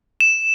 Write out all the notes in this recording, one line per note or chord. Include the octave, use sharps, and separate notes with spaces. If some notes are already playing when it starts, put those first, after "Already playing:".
E7